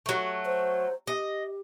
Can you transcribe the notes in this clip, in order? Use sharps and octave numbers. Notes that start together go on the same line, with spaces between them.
F#3 A3
C5
G4 D#5